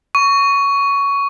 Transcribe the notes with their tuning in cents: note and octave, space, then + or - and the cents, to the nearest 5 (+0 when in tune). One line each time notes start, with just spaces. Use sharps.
C#6 +15